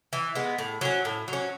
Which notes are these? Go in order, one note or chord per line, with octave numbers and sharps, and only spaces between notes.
E3
G#3 B3
A2
F#3 C#4
A2
F#3
C#4